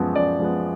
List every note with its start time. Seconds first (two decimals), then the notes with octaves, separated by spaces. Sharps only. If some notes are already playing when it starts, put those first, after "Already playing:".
Already playing: F#2 F3 G#3 B3
0.15 F#2 D5
0.40 F3 G#3 B3